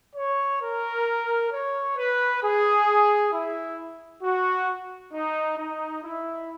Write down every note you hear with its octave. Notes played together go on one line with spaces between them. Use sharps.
C#5
A#4
C#5
B4
G#4
E4
F#4
D#4
D#4
E4